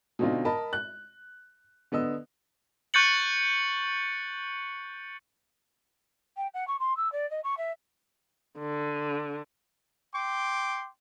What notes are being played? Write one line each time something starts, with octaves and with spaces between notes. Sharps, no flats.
B2 D3 C4 D#4 F4
A#4 D#5 A5 B5
F#6
D3 B3 D#5 E6
C#6 F#6 G6 A6 C#7 F#7
G5
F#5
C#6
C6
E6
D5
D#5
C#6
E5
D3
G5 C6 D6